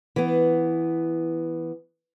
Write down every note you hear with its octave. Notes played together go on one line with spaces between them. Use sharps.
E3 B3